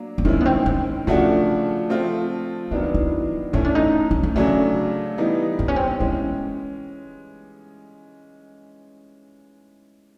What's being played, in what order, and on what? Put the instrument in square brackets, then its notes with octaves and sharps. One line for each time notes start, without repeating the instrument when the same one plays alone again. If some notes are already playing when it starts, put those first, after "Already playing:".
Already playing: [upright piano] F#3 A#3 D4
[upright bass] B3
[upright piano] D#3 G#3 C#4 E4 [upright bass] C4
[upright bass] B3
C4
C4
[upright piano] C#3 F3 A3 D4 F#4 [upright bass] C#4
[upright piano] F3 A3 C4 F4
[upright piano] D#3 F#3 B3 D4 [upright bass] E4
[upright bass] E4
[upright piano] E3 A3 C#4 [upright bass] D#4
[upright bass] D4
D#4
D#4
D4
[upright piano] C#3 F#3 A3 D4 [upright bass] C#4
[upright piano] E3 G3 B3 D#4
[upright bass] C4
C#4
C4
[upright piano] E3 G#3 C#4 [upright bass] B3